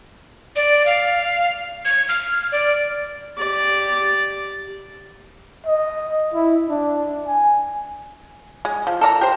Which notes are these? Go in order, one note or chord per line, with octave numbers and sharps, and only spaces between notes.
D5
F5
G#6
F6
D5
G4 D5
D#5
E4
D4
G#5
G#3
F3
A4 A#4 D5 A#5
G4 C5